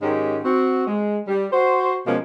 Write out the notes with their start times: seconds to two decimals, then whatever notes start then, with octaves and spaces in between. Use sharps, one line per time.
0.02 G#2 D#3 G#3 C#4 G4
0.44 C4 F#4
0.87 G#3
1.28 G3
1.52 F#4 C5
2.06 B2 F3 G#3 A#3 C#4